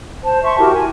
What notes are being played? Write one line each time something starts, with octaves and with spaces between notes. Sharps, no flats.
C5 A5
E5 A5 C6 C#6
E4 F#4 G4 A#4
G#5